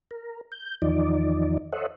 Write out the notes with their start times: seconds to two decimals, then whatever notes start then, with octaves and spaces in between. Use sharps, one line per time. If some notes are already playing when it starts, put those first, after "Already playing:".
0.11 A#4
0.52 G6
0.82 E2 D#3 F3 D#4 D5
1.72 A4 C5 C#5 D#5 E5 F#5